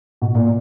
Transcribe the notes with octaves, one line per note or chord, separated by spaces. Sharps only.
B2
A#2